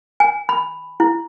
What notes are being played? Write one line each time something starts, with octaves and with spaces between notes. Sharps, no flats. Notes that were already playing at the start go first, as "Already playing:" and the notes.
G#5
B5
E4